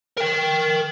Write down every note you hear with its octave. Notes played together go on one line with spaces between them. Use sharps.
A#4 G5